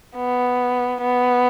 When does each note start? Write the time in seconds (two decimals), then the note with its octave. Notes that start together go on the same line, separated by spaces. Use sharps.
0.16 B3
1.01 B3